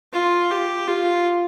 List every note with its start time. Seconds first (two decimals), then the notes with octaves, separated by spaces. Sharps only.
0.13 F4
0.51 G4
0.88 F4